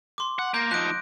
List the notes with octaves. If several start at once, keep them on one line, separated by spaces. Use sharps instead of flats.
C6 D6
F#5
A#3 G6 A#6
F3 D#4 F#6 D7